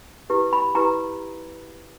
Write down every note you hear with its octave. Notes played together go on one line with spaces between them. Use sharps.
E4 G4 B4
B5
E4 G4 B4 A#5